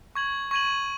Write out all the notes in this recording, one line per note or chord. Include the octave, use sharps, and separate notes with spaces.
C#6 G#6 F#7
C#6 G#6 D#7 F#7